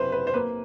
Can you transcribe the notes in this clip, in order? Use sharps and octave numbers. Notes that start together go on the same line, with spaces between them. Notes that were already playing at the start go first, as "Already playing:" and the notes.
Already playing: F#1 C3 F#3 B4 C5
B4
C5
A#3 B4